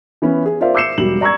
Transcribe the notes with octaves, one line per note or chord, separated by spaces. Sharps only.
E3 B3 C#4
G#4
F4 A#4 C5 D5 E5 F5
D6 E6 G6 C7 C#7 E7
E1 F#3 G3 F#7
D5 A#5 C#6 E6 G#6